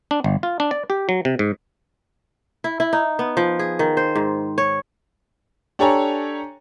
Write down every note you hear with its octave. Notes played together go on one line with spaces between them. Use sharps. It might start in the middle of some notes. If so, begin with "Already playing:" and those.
D4
G1
F4
D4
D5
G4
F#3
C3
G#2
E4
E4
D#4
B3
F3
G#4
D#3
C5
G#2
C#5
D4 G4 A4 C#5 G#5 A#5